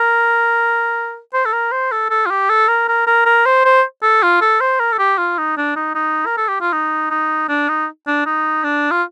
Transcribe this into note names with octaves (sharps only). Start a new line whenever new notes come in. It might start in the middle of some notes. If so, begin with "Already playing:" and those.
Already playing: A#4
C5
A4
A#4
C5
A4
A4
F4
G4
A4
A#4
A#4
A#4
A#4
C5
C5
A4
F4
A4
C5
A#4
A4
G4
F4
D#4
D4
D#4
D#4
A#4
A4
G4
F4
D#4
D#4
D4
D#4
D4
D#4
D4
F4